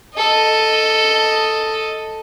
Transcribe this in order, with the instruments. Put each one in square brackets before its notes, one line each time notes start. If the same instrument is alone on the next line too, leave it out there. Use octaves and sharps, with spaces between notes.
[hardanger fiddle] A4 D#5